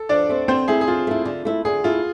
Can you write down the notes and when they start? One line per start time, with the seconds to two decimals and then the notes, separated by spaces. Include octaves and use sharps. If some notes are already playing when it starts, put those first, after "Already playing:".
Already playing: A4
0.09 F3 D4 D5
0.29 A3 C4
0.48 D3 C4 C5
0.68 A3 E4 G#4
0.81 G#4
0.87 D3 F4
1.07 A3 E4
1.25 D3
1.45 A3 E4
1.65 D3 G#4
1.84 A3 E4 F4